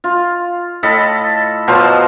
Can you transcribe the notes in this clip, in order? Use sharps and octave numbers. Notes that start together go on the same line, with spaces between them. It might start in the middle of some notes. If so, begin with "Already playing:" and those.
F4
A2 A4 D#5 B5
B2 F3 F#3 C5